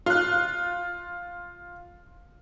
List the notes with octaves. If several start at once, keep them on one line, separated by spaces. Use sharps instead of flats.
F4 F#6